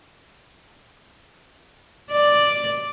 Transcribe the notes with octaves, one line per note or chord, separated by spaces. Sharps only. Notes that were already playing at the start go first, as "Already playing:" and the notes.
D5